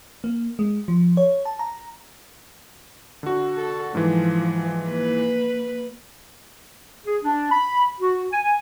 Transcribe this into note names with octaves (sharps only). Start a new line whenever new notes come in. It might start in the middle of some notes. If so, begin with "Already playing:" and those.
A#3
G#3
F3
C#5
A5
A#5
D3 F#4
A4
G#2 E3 F3
A#3 B4
G#4
D4
B5
F#4
G#5